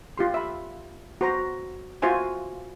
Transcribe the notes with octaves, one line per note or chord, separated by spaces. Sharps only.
F4 G4 C6
E5 B5
F#4 C5 A#5
F4 F#4 C5 E5 G#5 C6